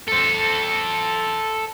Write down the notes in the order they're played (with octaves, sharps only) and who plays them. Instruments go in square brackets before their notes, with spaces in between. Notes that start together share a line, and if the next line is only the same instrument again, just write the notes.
[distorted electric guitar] A4 C5